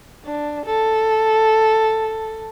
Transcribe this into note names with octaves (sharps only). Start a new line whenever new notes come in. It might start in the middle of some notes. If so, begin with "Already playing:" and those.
D4
A4